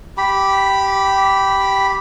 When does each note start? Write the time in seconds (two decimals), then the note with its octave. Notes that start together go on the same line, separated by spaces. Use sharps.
0.17 G4 B5